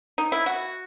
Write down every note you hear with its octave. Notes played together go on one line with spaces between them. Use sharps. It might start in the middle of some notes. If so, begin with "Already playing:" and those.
D#4
E4
F#4